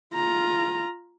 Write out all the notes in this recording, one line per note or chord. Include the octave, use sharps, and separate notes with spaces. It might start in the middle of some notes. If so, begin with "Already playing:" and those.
F4 A#5